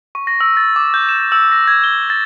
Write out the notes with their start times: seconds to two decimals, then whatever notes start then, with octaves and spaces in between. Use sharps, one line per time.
0.15 C#6
0.27 A#6
0.41 E6
0.57 A6
0.76 D6
0.94 G6
1.09 E7
1.32 E6
1.52 A#6
1.67 G#6
1.84 G7
2.10 A6